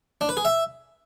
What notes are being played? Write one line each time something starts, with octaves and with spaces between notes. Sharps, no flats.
D4
B4
G#4
E5